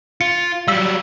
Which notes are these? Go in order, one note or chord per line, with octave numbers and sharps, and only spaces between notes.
F4 C#7
F#3 G3 F5 E6 B6